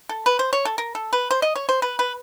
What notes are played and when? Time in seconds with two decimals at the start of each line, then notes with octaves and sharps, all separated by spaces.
0.09 A4
0.26 B4
0.39 C5
0.53 C#5
0.65 A4
0.78 A#4
0.95 A4
1.13 B4
1.31 C5
1.42 D#5
1.56 C#5
1.69 C5
1.82 B4
1.99 B4